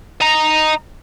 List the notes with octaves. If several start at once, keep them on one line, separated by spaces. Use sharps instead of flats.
D#5 A#5